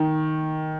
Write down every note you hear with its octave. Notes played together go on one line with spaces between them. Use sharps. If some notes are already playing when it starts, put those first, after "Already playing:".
Already playing: D#3